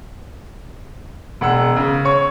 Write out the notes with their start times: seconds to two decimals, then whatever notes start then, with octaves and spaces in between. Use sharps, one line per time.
1.41 E1 F#5 E6
1.76 C#3
2.05 C#5 C#6